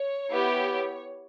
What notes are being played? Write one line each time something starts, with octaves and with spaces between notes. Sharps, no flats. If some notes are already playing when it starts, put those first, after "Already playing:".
Already playing: C#5
B3 E4 G4